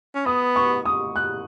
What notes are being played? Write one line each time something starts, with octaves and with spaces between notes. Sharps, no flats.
C#4
B3 D#6
C#6
D#6
F#6